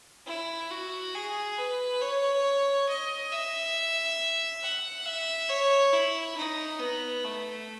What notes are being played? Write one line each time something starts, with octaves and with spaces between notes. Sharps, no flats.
E4
F#4
G#4
B4
C#5
D#5
E5
F#5
E5
C#5
E4
D#4
B3
A3